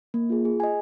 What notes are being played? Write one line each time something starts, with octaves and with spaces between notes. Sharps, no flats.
A#3
F4 G#4
G#4
D#5 G#5